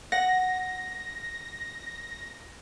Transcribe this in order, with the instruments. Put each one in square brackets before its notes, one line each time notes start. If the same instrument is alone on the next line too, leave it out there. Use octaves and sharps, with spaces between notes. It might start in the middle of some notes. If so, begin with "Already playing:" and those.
[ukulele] F#5 [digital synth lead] A#6